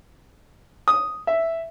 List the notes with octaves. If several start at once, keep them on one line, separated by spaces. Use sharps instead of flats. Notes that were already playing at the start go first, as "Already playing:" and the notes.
D#6
E5